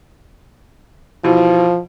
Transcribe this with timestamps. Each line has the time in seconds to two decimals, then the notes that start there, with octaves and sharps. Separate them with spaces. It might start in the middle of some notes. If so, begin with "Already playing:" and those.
1.24 B2 E3 F3